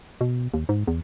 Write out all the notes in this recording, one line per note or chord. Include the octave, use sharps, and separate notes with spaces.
B2
D#2
G#2
E2